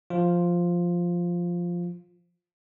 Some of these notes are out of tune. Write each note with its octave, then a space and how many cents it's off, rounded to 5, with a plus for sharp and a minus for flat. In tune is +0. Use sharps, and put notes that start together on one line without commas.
F3 +0 F4 +0